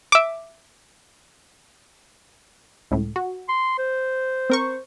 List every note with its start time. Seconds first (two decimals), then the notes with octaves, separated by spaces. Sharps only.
0.12 E5 D6
2.91 C#2 A2
3.16 F#4
3.49 C6
3.78 C5
4.50 C4 A#4 C#6